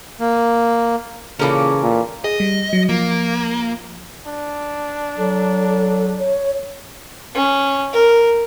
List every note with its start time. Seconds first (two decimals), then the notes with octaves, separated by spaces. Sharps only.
0.20 A#3
1.39 A#2 C#3 E3 C#4 A4 A#4 D6
1.82 A#2
2.24 G#4 D#5
2.40 G3
2.73 F#3
2.89 F3 A#3
4.27 D4
5.18 F#3 A4
6.19 C#5
7.34 C#4
7.93 A#4